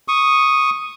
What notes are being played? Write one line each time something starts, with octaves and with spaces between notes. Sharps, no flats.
C#6 D#6